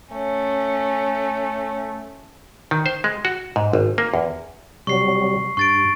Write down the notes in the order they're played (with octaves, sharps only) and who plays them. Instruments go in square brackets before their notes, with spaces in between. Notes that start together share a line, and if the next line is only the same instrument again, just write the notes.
[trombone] A3 [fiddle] C#4
[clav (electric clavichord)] D#3
C5
G#3
F#4
G#2
G#1
A#3
E2
[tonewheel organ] C3 F#3 G3 [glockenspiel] C#6 C7
[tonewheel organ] G2 [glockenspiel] C#6 A6 D7